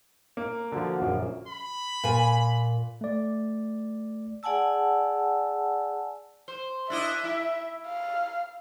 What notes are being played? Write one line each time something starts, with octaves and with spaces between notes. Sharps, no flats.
A#3
D3 F3 F#4 F#5
A#1 F#2 C#3
B5
A#2 G#5
A3 D5
G#4 D5 F#5 G#5 A5 E6
C5
D4 E4 D#5 E5
E4
F5